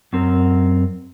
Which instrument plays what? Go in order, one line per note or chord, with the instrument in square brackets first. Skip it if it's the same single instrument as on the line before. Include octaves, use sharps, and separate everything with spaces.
[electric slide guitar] F#2 C4 A#4